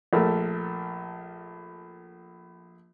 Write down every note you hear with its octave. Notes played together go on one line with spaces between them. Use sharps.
A#1 A3 A#4